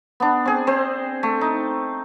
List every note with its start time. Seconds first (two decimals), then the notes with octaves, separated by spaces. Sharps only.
0.20 B3 D4
0.45 C4 G#4
0.67 C4 C5
1.23 A3
1.41 D#4